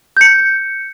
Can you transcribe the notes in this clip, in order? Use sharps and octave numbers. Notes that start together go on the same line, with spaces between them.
G6 C#7